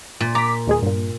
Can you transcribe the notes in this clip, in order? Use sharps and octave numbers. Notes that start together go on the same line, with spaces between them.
A#2
A#5 D6 B6
D#2 G#3 G#4
G2 A#2